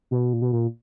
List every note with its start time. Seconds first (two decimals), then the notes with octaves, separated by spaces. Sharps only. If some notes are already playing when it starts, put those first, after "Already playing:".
0.11 B2
0.33 A#2
0.42 B2
0.53 A#2